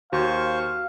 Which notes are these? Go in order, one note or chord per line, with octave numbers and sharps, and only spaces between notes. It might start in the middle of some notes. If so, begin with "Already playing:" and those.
D#2 F#4 C5 F5 C#6